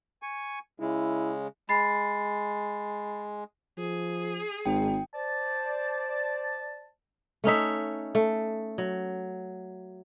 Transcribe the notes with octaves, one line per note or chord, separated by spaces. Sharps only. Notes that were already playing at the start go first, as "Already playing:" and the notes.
G#5 C#6
C#3 G#3 E4
G#3 B5 A6 C7
F3 G#4
G#1 G#2 G5
C5 D5 A5
A3 C#4 D#4 E5
A3
F#3